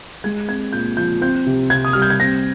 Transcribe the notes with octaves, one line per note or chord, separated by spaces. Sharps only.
G#3 G#6
C4 G#6
A#2 G6
F3 G6
C4 G6
C3
C3 G#6
D#6
G3 F6
G6
G#6
C4 A#6